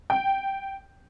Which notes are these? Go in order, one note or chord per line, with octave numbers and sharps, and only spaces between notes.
G5